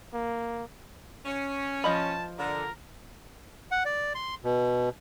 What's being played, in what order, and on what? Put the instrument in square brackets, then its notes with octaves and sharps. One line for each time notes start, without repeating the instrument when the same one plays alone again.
[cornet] A#3
[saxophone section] C#4
[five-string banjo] F3 D#5 B5 [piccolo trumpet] A5
[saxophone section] D3 [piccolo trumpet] A#4
[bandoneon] F#5
D5
C6
B2